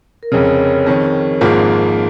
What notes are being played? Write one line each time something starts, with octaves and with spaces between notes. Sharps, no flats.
A#4
F1 F2 C#3 G#4 C#5
F2 D#3 C#4
G#1 G#2 F3 A#3 D#4 F4 G#4